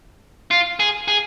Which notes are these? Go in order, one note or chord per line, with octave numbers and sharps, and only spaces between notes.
F4
G#4
G#4